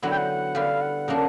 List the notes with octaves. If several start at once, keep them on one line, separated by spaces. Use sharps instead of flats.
D3 F#3 B3 E4 F#5
G5
F#5
D3 G3 B3 F5
F#5
C#3 F#3 A#3 D4